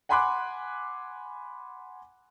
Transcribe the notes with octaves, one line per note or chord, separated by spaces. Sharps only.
F#5 G#5 B5 C6 D6 F#6